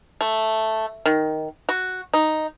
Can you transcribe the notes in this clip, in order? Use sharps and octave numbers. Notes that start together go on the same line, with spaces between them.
A3
D#3
F#4
D#4